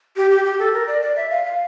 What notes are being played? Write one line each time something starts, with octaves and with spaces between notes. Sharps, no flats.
G4
G4
G4
A4
A#4
D5
D5
E5
F5
F5